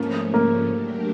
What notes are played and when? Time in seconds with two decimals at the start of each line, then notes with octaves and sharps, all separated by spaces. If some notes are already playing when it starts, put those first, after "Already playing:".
Already playing: G#2 F3 A3 A#3 C#4
0.34 A#3
0.68 F#3 A3 D4 G4 A#4